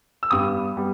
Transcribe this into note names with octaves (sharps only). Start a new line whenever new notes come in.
E6
G2 G3 B3 D#6
G3 B3